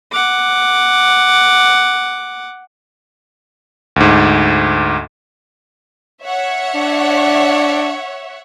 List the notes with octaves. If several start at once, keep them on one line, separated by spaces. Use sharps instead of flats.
F#5 D6
D2 G#2
C#5 E5 F#5
D4